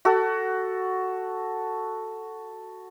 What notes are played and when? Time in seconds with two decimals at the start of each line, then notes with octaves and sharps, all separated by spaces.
0.05 F#4 A4